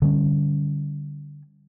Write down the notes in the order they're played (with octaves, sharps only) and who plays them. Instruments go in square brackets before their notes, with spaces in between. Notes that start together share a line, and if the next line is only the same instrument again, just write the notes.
[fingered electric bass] D3 G3 C#4